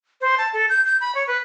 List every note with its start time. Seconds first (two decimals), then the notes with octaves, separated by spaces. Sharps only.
0.21 C5
0.38 A5
0.53 A4
0.69 G6
0.86 G6
1.01 B5
1.15 C#5
1.28 B4